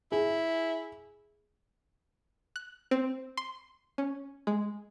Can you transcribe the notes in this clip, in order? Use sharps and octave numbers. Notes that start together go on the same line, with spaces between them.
E4 G#4
F#6
C4
C6
C#4
G#3